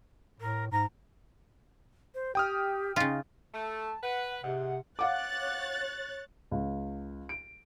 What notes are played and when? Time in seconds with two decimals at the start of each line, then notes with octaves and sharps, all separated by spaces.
0.40 A2 A#4
0.71 G#2 A#5
2.14 C5
2.35 G4 G5 D#6 F6
2.96 C#3 D#4 F4
3.54 A3 A5
4.03 B4 F#5
4.43 G#2 C3 F#5
4.99 C#5 F5 F#5 D6 F#6 A6
6.51 C#2
7.29 D7